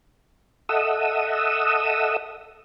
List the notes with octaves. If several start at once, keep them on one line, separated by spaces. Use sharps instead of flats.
A4 D#5 E5 F#5 D#6 E6